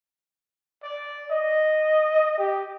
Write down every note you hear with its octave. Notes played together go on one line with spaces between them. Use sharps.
D5
D#5
G4